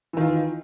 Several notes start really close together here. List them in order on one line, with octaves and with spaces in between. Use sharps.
E3 D#3 F4